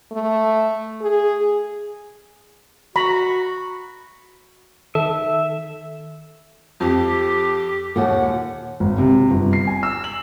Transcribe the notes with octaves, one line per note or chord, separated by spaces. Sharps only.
A3
G#4
F#4 A#5 B5
D#3 A4 E5
F2 G4
D#2 A#2 F#5
G#1
C3
G1
C7
G#5
E6
F#7